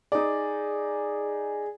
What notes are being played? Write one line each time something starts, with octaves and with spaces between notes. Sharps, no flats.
D#4 G#4 D5